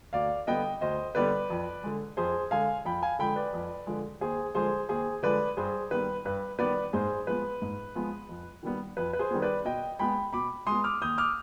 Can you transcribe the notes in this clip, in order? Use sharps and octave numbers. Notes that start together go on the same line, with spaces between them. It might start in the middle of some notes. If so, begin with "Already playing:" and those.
D2 D5 F5
D3 G3 B3 D#5 G5
D2 C5 D#5
D3 G3 B3 B4 D5
F2
D3 G#3
F2 G#4 C5
D3 G#3 F5 G#5
F2 G5 B5
F5 G#5
D3 F3 G#3 G5 B5
B4 D5
F2
D3 F3 G#3
D#2 G#4 C5
D3 F3 G#3 G#4 C5
D#2 G#4 C5
D3 F3 G#3 B4 D5
G2 G#4 C5
D#3 G3 B3 B4
G2 B4
D#3 G3 B3 B4 D5
G#2 G#4 C5
F3 G#3 B3 B4
G#2
F3 G#3 B3
F2
D#3 G3 B3
F2 B4
B4
G#4 C5
D#3 G3 B3
B4 D5
B2 D#5 G5
G#3 B3 G5 B5
B2 B5 D6
G#3 C6 D#6
B3
D6 F6
D#2 D#6 G6
D6 F6